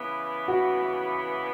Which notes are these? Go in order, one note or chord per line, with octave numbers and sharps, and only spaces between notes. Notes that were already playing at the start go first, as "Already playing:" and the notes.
Already playing: C#3 E3 B3
F#4